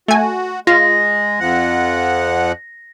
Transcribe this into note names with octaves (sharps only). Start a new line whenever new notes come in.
A3 F#4 G#5
G#3 F4 A#6
F2 F3 F#5